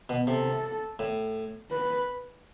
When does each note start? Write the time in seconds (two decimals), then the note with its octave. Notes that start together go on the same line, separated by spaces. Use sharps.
0.09 B2
0.27 C3 A4
0.99 A2
1.71 B4